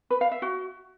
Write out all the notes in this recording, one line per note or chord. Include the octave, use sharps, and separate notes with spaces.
B4
F5
E5
F#4